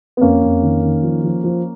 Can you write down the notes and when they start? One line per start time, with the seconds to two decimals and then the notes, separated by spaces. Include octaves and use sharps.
0.17 B3
0.21 F2 A#3 C#4
0.42 F2
0.62 D#3
0.83 D#3
1.03 F3
1.24 F3
1.44 F3